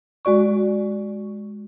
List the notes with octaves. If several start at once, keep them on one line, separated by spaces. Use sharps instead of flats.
G#3 F#4 D5 C#6